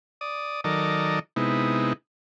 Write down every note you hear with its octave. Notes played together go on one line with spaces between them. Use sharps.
D5 D#6
D#3 F#3 A4 A#4 D5 D#5
C3 G#3 B3 D#4 E4